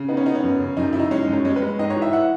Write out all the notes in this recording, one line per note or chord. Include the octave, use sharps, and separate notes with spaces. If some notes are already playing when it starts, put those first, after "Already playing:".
Already playing: C#3
B3 D#4
C#4
B3 D#4
C#4
F#2
C#3
F#2 D#4
C#3 E4
D#4
G#3 C#4
F#2 D#4
C#4
G#3 C#4
B4
G#3
G#2 D#5
C#5
E3
E5
F#5